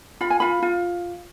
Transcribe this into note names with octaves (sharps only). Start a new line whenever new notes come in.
F4 B5
G#5
F4 B5
F4